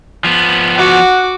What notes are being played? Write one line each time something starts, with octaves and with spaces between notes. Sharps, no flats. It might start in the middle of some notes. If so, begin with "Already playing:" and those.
F3 B3
F#4 F#5 D6